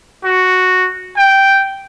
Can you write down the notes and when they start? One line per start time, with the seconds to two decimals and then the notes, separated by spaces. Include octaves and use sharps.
0.24 F#4
1.16 G5